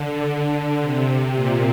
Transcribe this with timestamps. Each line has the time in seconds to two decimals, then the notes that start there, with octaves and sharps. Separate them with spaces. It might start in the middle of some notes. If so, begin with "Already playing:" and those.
Already playing: D3
0.82 C3
1.35 A#2